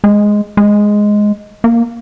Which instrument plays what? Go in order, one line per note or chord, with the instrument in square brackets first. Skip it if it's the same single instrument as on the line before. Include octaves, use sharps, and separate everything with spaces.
[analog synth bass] G#3
G#3
A#3